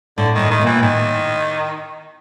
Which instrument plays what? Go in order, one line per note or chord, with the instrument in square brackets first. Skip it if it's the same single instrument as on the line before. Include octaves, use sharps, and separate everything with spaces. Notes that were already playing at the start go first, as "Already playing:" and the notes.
[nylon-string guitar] A2 [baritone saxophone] D3
[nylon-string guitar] A2 [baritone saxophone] D#3
[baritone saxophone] D#3
[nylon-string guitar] A#2 [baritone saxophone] E3
[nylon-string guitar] A2 [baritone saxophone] D#3